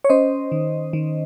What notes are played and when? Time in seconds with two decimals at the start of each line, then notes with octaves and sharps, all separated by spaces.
0.04 C#5
0.09 C#4 C5 D#5
0.52 D#3
0.93 D#3